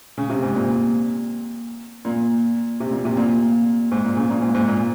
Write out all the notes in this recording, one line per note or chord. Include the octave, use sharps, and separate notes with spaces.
C#3
C3
G#2
A#2
A#2
C3
A#2
C3
A#2
G#2
A#2
C#3
A#2
G#2
G#2
A#2